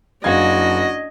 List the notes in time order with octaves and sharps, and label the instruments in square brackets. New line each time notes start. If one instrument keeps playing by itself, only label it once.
[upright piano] F#1 F5 G#6 [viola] D4 D#5 [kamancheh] F#4